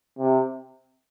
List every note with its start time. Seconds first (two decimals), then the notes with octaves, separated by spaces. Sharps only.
0.19 C3